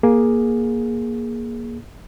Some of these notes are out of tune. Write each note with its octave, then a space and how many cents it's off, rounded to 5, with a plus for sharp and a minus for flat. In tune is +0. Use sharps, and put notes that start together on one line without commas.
A#3 +15 G#4 +0